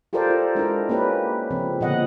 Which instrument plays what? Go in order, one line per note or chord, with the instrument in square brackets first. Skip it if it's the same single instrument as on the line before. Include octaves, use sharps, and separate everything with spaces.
[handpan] F4 G4 A4 A#4 C5 D5
F4
G#3 D4 E4 A#4
A#3 C#4 G4 B4
C#3 F3 C4
A#2 D3 F3 B3 D#5 F#5